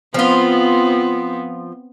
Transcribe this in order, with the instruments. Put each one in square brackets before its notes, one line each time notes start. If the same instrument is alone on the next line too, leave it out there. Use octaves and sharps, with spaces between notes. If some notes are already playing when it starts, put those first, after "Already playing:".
[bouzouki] F3 F4 [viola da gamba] B3 C4